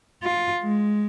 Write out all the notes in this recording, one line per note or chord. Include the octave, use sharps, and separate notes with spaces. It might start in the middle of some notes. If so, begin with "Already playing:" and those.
F4
G#3